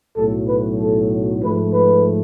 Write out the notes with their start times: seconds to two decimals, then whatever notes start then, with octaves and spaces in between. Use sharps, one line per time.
0.16 B1 A2 F#3 A3 A4
0.48 B4
0.80 A4
1.43 G#2 F3 A3 B4
1.73 B4